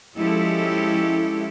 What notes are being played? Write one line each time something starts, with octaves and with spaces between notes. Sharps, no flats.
F3 G#3 C#4 E4 G4 A4